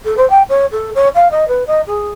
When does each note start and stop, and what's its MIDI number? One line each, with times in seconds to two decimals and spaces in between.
0.05 0.14 69
0.17 0.28 72
0.30 0.42 79
0.49 0.66 73
0.71 0.90 69
0.95 1.08 73
1.15 1.28 77
1.31 1.44 75
1.48 1.66 71
1.67 1.80 75
1.87 2.11 68